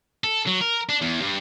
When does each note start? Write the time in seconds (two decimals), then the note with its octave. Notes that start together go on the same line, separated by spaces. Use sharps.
0.24 A4
0.47 F#3
0.61 A#4
0.89 D4
1.02 E2
1.22 G2